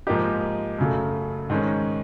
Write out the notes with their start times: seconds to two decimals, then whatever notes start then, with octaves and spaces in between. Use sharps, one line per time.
0.07 G#2 F3 A#3 D#4 G4
0.79 F#2 C#3 F#3 A3
1.50 G#2 D#3 G#3 C#4